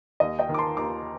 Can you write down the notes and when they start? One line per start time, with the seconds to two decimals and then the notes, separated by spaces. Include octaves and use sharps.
0.20 D#2 D#5
0.39 D#5 G5
0.49 D#3
0.54 D6
0.58 A5 C6
0.77 D#2 A#5 D6